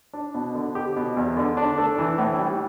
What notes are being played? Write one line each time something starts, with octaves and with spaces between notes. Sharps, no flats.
D4
B2
D3
G4
B2
E2
D3
D4
A3
E3
A2
G3